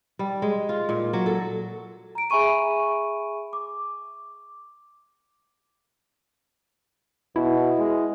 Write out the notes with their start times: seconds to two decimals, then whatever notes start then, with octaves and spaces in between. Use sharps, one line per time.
0.19 G3
0.42 G#3
0.69 F4
0.89 A#2
1.13 F#3
1.26 A4
2.15 A#5 D7
2.30 G#4 E5 G#5 B5 C#6 D#7
3.53 D6
7.36 B2 E4
7.79 G#3